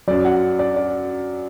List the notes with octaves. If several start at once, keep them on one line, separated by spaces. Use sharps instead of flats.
F#2 F#3 D5
F#5
D5
D5